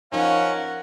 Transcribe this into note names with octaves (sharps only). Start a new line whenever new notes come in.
F3 C#4 D#4 A#4 F5 F#5